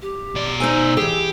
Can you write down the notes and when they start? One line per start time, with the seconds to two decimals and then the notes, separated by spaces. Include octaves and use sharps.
0.02 G4
0.35 B2 D5
0.60 D#4 C5 G#5 E6
0.97 E3 G4 G#4